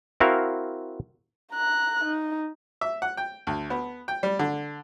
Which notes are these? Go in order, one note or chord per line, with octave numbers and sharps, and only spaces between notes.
C4 E4 F#4 A#4 F5
A#5 F#6
D#4
E5
F#5
G5
D2
B3
G5
G3
D3